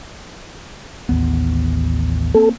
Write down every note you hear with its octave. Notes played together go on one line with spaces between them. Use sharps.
A1 D#2 B3
A#3 C4 A4